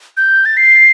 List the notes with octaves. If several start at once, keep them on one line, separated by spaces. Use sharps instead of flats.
G6
A6
C7